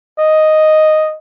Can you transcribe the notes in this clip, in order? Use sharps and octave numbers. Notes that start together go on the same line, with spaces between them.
D#5